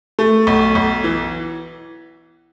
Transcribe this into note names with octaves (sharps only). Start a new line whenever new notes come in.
A3
B1
B1
E3